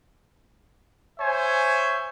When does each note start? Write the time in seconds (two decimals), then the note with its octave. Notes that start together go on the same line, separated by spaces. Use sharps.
1.19 C5 C#5 E5 G#5